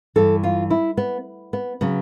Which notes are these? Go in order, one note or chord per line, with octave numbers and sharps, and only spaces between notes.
G2 E3 A4
F4
E4
B3
B3
C#3 F#3 B3